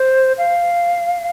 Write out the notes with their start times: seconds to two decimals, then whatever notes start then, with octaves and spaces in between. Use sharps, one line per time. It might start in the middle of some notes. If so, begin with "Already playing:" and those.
Already playing: C5
0.38 F5